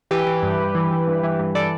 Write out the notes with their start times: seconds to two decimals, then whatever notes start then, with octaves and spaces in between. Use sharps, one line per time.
0.11 E3 G4 B4
0.27 E3
0.43 G2
0.59 G2
0.75 E3
0.91 E3
1.08 G2
1.23 E3
1.39 G2
1.55 E3 A4 D5